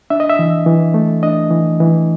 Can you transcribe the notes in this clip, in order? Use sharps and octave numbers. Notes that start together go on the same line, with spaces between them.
D4 E5
D#5
E5
E3
E3
A3
D4 D#5
E3
E3